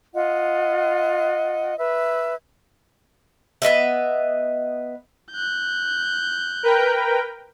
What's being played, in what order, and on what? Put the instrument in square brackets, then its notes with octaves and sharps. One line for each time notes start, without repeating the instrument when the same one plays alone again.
[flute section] F4 D#5 F#5
B4 E5
[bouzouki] B3 B4 D#5 E5
[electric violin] F#6 G6
[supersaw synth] A#4 B4 G5